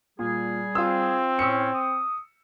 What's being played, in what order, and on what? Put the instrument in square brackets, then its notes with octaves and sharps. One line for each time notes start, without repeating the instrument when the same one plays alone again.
[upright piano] A#2 [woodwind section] G3 G#4
[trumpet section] C4 [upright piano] F4 C6 E6
[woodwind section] A2 C#4 [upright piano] E6 C#7
[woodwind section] D#6